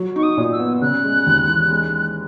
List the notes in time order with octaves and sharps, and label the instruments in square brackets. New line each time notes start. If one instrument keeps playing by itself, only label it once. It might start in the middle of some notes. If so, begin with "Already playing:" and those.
Already playing: [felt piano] F#3
[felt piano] D#4 [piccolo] C#6
[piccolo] D#6
[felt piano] A#2
[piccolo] E6
[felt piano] B3
[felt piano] C#3 [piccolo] F#6
[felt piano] G#3
D#2
E3
G#3